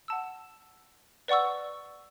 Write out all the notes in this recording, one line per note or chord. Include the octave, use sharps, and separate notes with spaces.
F#5 A5 E6
B4 D5 F#5 C#6 E6